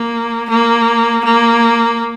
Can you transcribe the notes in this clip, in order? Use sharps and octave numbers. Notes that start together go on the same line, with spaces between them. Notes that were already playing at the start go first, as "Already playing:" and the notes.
Already playing: A#3
A#3
A#3